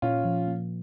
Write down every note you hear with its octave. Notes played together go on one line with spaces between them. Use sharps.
A#2 C#4 F4
F3
A#3